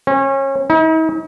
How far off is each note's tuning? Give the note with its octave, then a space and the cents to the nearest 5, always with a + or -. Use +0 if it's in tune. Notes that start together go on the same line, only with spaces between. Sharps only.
C#4 -30
D#4 +45